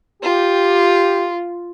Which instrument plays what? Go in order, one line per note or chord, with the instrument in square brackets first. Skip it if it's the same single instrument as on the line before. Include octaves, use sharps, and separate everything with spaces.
[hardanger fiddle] F4 [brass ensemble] G4